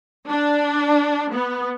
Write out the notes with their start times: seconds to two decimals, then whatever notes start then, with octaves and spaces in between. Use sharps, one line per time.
0.28 D4
1.33 B3